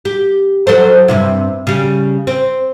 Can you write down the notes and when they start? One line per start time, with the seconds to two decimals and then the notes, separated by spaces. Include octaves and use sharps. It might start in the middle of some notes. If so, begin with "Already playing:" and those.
0.05 G4
0.67 F#3 A4 C5
1.08 G2 C3 E4
1.67 C#3 G3
2.27 C4